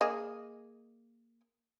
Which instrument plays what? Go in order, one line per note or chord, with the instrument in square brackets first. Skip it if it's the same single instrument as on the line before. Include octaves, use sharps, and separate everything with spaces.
[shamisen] A#3 G#4 D#5